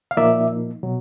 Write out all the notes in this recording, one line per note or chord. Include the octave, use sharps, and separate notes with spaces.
F5
A#2 F3 A#3 D#4 D5 E5
B2 F#3